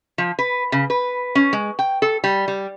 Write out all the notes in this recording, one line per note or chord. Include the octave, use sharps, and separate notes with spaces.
F3
B4
C#3
B4
C#4
G#3
G5
A4
G3
G3